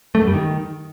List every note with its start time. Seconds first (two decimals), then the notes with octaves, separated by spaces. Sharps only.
0.15 A3
0.21 F#2
0.27 G3
0.34 D#3